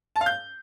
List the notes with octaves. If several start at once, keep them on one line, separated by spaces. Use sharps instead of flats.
A5
F5
G6